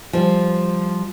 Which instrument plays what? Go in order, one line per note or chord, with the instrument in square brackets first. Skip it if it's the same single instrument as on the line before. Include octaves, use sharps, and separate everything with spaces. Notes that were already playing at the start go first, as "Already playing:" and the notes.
[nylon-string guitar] F3 G3